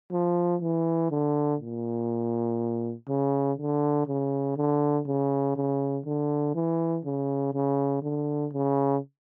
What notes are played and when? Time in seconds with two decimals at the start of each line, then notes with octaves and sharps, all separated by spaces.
0.12 F3
0.62 E3
1.11 D3
1.61 A#2
3.08 C#3
3.58 D3
4.07 C#3
4.57 D3
5.07 C#3
5.56 C#3
6.06 D3
6.55 E3
7.05 C#3
7.54 C#3
8.03 D3
8.53 C#3